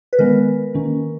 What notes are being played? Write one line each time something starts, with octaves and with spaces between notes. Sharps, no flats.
B4
D#3 G#3 B3 A#4
D#3 A#3 C#4